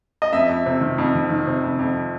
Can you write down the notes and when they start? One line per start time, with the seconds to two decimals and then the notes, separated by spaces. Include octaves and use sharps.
0.22 D#5
0.33 F2 E5
0.49 F2
0.66 C3
0.81 D#3
0.98 F2
1.15 D#3
1.31 D#3
1.47 C3
1.63 F2
1.79 F2